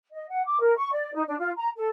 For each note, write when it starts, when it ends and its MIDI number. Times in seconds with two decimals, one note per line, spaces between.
0.13 0.26 75
0.28 0.42 78
0.46 0.59 86
0.60 0.74 70
0.77 0.90 85
0.91 1.11 74
1.14 1.22 63
1.27 1.35 62
1.39 1.50 65
1.57 1.68 82
1.76 1.88 69